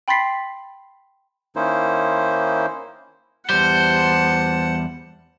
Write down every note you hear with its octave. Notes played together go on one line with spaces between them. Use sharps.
G5 B5 C6 A6 B6 C7
D#3 A#3 C#4 D#4 E4 C5
E2 G3 C5 F#5 A5